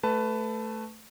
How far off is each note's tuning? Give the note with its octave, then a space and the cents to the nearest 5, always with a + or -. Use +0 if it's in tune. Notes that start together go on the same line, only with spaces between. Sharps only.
A3 +0 B4 +15 A5 +0